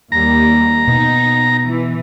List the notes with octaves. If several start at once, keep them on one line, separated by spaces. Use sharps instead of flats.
D#2 G3 A#5
B2 D#4
E3